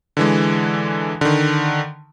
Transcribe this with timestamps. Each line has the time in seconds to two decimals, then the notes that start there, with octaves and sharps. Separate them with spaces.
0.17 D3 E3 G#3
1.21 D3 D#3